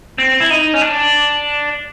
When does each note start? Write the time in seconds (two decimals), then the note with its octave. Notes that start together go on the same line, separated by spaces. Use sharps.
0.18 C4
0.40 E4
0.50 D#4
0.74 C#4
0.81 D4